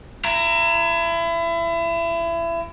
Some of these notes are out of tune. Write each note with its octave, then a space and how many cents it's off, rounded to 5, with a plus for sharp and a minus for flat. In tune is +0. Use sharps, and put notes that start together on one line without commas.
E4 +30 A#5 +0